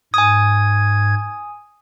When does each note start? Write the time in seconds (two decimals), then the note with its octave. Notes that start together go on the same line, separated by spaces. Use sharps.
0.14 G#2 G#5 D#6 G#6